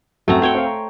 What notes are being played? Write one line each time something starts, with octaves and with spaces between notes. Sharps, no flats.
F#2 A3 C4 F#4 A#5
F#4 C5 C#5 G5
C4 F5
A#5